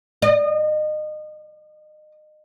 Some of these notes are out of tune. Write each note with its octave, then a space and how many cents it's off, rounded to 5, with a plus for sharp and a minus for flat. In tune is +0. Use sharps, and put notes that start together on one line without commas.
D#5 -30